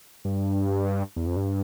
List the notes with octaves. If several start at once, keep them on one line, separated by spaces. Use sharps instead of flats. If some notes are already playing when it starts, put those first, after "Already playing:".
G2
E2
F2
G2